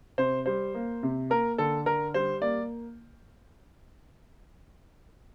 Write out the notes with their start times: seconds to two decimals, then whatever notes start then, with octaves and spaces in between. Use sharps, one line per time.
0.18 C3 C5
0.46 G3 C5
0.74 A#3
1.03 C3
1.30 A#3 A#4
1.58 D3 A4
1.86 D3 A#4
2.14 G3 C5
2.42 A#3 D5